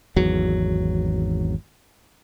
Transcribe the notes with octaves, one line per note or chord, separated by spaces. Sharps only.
G#1 E2 F#3